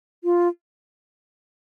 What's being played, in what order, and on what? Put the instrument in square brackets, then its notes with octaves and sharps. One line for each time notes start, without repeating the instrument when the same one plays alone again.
[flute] F4